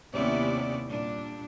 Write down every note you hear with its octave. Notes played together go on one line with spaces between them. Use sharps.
D#2 C3 B3 C#4 E4 D5
A#2 G3 D4